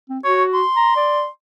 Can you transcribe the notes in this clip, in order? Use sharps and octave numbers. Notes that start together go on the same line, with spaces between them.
C4
F#4 C#5
C6
A#5
D5